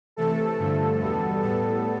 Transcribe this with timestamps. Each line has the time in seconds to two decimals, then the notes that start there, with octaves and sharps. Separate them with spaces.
0.16 C3 E3 A3 A4
0.59 G2 D3 F3 A3
1.01 E2 B2 G3 B3
1.42 A2 G3 B3 A4